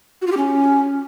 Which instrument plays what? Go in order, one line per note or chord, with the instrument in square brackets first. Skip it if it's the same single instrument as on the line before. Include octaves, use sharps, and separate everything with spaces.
[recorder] F#4
F4
G4
C#4